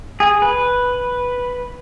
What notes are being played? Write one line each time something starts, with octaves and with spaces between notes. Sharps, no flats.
G#4
B4